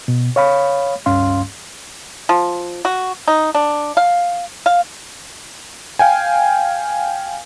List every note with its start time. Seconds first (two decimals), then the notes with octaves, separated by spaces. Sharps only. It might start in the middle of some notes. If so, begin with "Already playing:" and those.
0.08 B2
0.36 C#5 F5 B5
1.06 C#2 G2 C#4 F5 C6
2.29 F3
2.85 F#4
3.28 D#4
3.55 D4
3.97 F5
4.66 F5
5.99 F5 G5 G#5